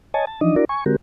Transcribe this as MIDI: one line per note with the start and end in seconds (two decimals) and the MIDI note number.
0.14 0.25 73
0.14 0.25 75
0.14 0.25 80
0.14 0.25 81
0.27 0.40 81
0.41 0.55 52
0.41 0.55 53
0.41 0.55 62
0.41 0.55 63
0.41 0.55 75
0.56 0.65 62
0.56 0.65 64
0.56 0.65 66
0.56 0.65 70
0.56 0.65 74
0.69 0.84 80
0.69 0.84 85
0.86 0.96 50
0.86 0.96 56
0.86 0.96 60
0.86 0.96 66
0.86 0.96 67
0.86 0.96 70